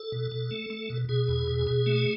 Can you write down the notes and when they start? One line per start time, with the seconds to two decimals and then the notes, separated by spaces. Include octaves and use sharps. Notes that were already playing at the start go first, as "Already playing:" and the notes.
Already playing: A4
0.12 B2
0.32 B2
0.51 A3
0.70 A3
0.90 B2
1.09 B2 G#4
1.28 E2
1.47 B2
1.67 B2
1.86 A3